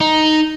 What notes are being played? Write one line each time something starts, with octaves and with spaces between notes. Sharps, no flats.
D#4